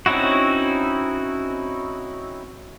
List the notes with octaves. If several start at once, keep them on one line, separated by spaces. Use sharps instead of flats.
C4 C#4 D#4 E4 F#4